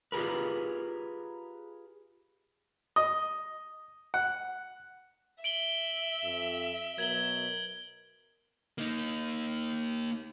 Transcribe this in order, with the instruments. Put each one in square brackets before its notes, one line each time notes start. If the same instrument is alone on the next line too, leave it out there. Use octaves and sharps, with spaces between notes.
[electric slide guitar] F4 G4 G#4 A#4 B4
[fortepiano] D#5
F#5
[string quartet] E5 [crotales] D7 F#7 G7
[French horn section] F2
[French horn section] B2 F#3 A#4 [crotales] G#6 F#7 G7
[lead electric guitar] A#3 D#4